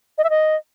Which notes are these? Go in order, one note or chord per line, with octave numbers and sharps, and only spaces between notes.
D#5
E5
D#5